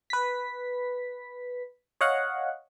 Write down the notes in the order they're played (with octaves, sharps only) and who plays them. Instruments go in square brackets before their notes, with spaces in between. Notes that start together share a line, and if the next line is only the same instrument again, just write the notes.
[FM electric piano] B4 B6
C#5 D#5 F5 F#5